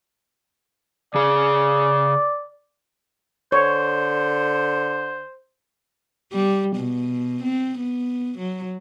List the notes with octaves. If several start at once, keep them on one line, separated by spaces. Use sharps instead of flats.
C#3 G#4 D5
D3 C5 C#5
G3
B2
C4
B3
F#3